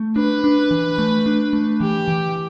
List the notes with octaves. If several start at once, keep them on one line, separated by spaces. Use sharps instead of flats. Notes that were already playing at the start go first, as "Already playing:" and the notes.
Already playing: A3
D4 B4
D4
E3
A3
D4
A3
E3 G4
E3